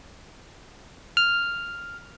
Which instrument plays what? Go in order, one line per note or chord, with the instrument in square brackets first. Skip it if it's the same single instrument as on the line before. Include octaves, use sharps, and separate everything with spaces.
[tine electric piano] F6